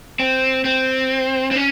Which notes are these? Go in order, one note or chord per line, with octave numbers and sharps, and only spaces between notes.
C4
C4
C4
C#4